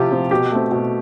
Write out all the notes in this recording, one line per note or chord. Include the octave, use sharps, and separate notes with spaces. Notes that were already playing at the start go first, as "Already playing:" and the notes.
Already playing: C3 F3 C4 F4 G4
F3 C4
B2 G4
A3 C4
B2